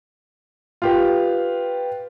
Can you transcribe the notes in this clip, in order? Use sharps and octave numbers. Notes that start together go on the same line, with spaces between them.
F4 G4 B4